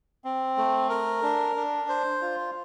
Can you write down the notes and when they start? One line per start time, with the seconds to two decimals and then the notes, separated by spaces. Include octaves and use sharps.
0.24 C4
0.57 A3
0.90 A#4
1.23 D4
1.56 D4
1.89 C5
2.21 F4